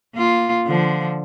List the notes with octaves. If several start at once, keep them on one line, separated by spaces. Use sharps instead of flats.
A#3 F4
D3 F3